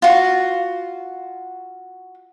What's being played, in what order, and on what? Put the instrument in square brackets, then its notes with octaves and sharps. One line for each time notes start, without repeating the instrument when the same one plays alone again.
[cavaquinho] F4 F#4